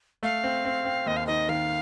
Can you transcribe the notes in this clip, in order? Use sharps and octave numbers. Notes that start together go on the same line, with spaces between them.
A3 F5
C4
C4
C4
D#2 D#5
F5
D#3 D#5
D#3 F5